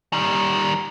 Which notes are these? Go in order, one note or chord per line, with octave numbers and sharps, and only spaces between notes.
D#3 G3